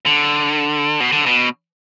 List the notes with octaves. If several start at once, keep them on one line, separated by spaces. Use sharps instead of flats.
D3
B2
D3
B2